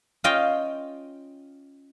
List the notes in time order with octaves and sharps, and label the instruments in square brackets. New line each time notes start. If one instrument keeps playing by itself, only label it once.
[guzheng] C#4 F4 D#5 F5 G5